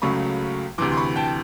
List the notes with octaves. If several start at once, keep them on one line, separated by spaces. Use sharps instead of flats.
C#2 C#3 F#3 A3 B5 C#6
D2 C3 E3 C6 D6
C6
B5 C#6
G5 A5